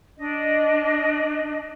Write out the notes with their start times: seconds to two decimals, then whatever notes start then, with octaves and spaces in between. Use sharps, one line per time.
0.18 D4 D#5